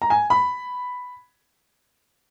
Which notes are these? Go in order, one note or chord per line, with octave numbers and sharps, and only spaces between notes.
A#5
G#5
B5